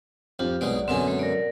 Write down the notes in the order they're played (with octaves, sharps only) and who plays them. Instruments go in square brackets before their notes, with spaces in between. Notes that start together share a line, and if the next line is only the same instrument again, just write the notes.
[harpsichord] F2 [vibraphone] D4 F4 G4
[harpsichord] B1 B2 G#3 [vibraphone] D5
[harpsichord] F#2 B2 D3 [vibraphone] C4 G#5
[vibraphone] G#3
A#4 D5